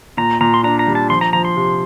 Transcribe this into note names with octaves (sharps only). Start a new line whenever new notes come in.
A#2 A#5
A#2 A#5
C6
D4 A#5
A#5
G3
A5
F3 C6
A#5
F3 A#5
C6
C3